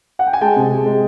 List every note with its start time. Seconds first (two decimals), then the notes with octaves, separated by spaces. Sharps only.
0.19 F#5
0.27 G5
0.33 G#5
0.41 G#3 G5 A5
0.56 C3
0.71 G#3
0.86 G#3